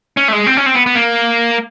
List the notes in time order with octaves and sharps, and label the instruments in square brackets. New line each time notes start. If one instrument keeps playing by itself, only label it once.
[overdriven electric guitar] C#4
A3
G#3
C4
C#4
C4
B3
B3
A#3